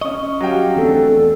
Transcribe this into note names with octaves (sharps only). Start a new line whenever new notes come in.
C#4 D#5 C#6
F#3 G4 F5 G5
E2 A3 C4 D4 A4